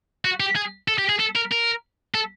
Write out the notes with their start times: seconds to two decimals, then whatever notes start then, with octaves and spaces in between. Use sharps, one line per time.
0.25 F#4
0.40 G4
0.56 G#4
0.88 A4
0.98 G4
1.09 G#4
1.19 A4
1.35 A#4
1.51 A#4
2.14 A4